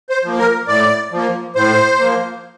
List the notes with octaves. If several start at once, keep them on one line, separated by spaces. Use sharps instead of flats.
C5
F3 A#3
A#4
A2 D5
F3 A#3
A2 C5
F3 A#3